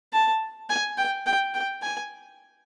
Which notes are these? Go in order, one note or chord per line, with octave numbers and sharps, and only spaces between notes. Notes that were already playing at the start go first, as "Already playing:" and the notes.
A5
G#5
G5
G5
G5
G#5